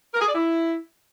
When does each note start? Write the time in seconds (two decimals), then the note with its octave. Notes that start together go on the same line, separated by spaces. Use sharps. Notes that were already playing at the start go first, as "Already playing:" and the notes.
0.13 A#4
0.20 G#4
0.27 D5
0.33 E4